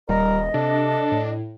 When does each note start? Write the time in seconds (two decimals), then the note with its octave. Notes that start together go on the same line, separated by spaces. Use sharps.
0.09 D#1 G3 A#4 D#5
0.54 C3 D4 A4
1.11 A2